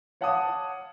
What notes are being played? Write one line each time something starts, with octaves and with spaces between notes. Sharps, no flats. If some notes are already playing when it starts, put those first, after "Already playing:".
C#5 F5 F#5 A5 D6 D#6